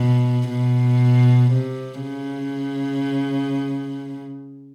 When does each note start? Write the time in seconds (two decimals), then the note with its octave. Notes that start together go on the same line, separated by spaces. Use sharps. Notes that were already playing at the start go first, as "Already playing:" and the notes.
Already playing: B2
0.49 B2
1.52 C3
2.02 C#3